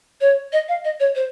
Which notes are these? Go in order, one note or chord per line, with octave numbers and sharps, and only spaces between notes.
C#5
D#5
F5
D#5
C#5
C5